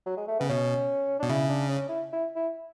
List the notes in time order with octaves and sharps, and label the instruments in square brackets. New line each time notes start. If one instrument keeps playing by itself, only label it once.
[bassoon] F#3
G#3
A3
[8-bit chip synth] C#3 [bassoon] B3
[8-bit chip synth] B2 [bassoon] C#4
[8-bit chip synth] B2 [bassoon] D4
[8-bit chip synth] C#3 [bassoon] E4
[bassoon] D4
C#4
E4
E4
E4